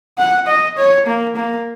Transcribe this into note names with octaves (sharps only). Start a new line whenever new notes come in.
F#5
D#5
C#5
A#3
A#3